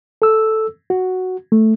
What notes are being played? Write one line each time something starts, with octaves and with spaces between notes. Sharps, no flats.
A4 E6
F#4
A3